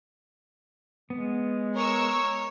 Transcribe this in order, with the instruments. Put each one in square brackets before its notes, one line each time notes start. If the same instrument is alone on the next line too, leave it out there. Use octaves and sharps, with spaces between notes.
[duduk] G#3 [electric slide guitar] B3
[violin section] A#4 C#6 E6 [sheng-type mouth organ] C#5